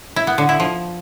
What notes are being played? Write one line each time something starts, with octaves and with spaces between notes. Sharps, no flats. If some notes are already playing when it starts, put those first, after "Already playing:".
E4
B3
D3
E4
F3